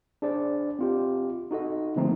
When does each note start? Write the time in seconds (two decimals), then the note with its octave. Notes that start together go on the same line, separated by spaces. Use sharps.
0.22 D4 G#4 C5 D5
0.79 C4 F4 G4
1.51 D#4 F#4 A4 D#5
1.96 D3 F3 A3 A#3 C4 D#4